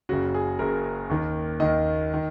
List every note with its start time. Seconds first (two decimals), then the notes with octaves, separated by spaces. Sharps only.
0.09 F#1 F#2 C#3 F#4
0.34 G#4
0.59 F#1 F#2 C#3 A#4
1.10 D#2 D#3
1.60 D#2 D#3 D#5
2.14 D#3